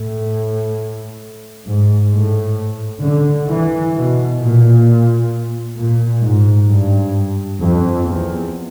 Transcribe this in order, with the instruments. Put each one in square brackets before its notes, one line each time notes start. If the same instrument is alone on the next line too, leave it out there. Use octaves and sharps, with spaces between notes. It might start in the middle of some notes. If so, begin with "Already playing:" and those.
Already playing: [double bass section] A2
G#2
A2
D3
E3
B2
A#2
A#2
G#2
G2
F2
E2